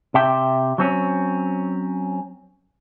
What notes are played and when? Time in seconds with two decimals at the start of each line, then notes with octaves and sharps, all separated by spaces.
0.14 C3 E5 G5
0.78 F#3 C4 C#4